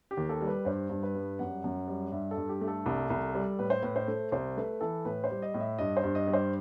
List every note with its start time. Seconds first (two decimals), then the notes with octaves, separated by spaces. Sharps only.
0.11 G4
0.17 D#2
0.29 A4
0.41 G3
0.47 B4
0.65 G2 C5
0.90 G2
1.03 B4
1.15 G3
1.39 F#2 F#5
1.64 F#2
1.88 G3
2.12 G2 E5
2.31 A4
2.37 G2
2.49 G4
2.61 A3
2.68 A4
2.86 C2
3.10 C2
3.35 G3
3.59 A2 B4
3.70 C5
3.82 A2 B4
3.96 C5
4.08 A3
4.32 C2 C5
4.57 A3 B4
4.81 E3 A4
5.05 A2 B4
5.24 C5
5.30 G3
5.42 D#5
5.54 A2
5.60 E5
5.78 G2 D#5
5.97 C5
6.03 G2
6.15 D#5
6.27 G3
6.33 C5